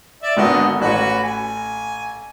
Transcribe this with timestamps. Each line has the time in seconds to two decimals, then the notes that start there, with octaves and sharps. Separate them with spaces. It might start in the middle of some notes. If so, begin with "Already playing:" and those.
0.22 D5 E5
0.37 G#1 G#2 D3 B3 F#4 D#5
0.81 A1 C#4 F#4 B4
1.22 G#5